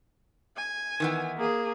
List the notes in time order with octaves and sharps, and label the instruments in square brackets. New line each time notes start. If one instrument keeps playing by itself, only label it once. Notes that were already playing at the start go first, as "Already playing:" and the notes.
[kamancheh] G#5
[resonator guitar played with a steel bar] D#3 E3 B3
[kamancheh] A#3 G#4